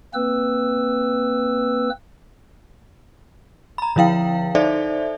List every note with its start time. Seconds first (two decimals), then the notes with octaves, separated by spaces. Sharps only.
0.14 A#3 C4 B4 E6
3.78 A#5 B5
3.96 D3 F3 E4 F5 G5
4.55 D#4 A4 C5 D5 E5